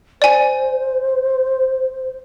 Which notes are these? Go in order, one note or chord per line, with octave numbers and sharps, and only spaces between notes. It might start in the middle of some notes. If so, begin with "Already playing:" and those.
C5 D5 G#5